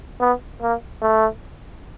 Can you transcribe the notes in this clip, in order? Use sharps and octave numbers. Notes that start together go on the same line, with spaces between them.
B3
A#3
A3